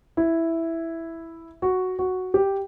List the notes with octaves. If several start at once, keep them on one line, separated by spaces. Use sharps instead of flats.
E4
F#4
F#4
G4